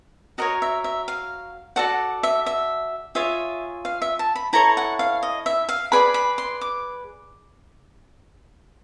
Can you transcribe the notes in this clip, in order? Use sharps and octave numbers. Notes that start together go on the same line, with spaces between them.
F#4 A#4 C#5 D#5
E5
E5
F5
F#4 A4 D5 F#5
E5
E5
F4 G#4 C#5 E5
F5
E5
A5
B5
E4 A4 C#5 A#5
F#5
F5
D#5
E5
F5
G#4 B4 D5 B5
B5
C6
D6